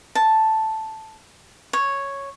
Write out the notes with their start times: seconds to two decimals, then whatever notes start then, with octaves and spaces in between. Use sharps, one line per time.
0.15 A5
1.73 C#5